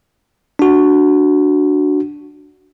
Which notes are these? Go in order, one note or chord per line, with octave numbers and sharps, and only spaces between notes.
D4 F#4